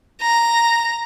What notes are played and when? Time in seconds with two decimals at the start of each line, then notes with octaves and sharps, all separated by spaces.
0.21 A#5